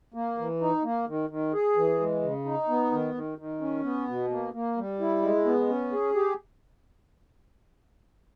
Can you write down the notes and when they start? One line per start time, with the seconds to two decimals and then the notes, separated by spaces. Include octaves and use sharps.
0.14 A#3
0.38 E3
0.61 D#4
0.83 A#3
1.08 D#3
1.30 D#3
1.53 G#4
1.76 E3
2.00 G#3
2.22 C#3
2.45 D#4
2.69 B3
2.91 D#3
3.14 D#3
3.38 D#3
3.61 C#4
3.84 B3
4.08 B2
4.31 A#3
4.53 A#3
4.77 G3
5.00 E4
5.22 G#3
5.45 B3
5.69 C#4
5.92 G#4
6.15 G4